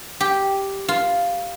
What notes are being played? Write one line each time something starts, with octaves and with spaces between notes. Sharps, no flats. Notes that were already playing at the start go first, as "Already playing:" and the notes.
G4
F4